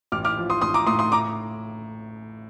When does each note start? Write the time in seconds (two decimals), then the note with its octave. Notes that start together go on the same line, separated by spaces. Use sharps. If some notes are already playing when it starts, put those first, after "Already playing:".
0.12 A1 D6 F6
0.25 D6 F6
0.37 F3
0.50 C6 D#6
0.61 A1 C6 D#6
0.74 A#5 D6
0.87 A2 C6 D#6
0.99 C6 D#6
1.12 A#5 D6